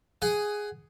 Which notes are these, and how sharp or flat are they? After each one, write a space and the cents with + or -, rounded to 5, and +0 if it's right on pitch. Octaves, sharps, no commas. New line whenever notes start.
G#4 +0 F#5 +20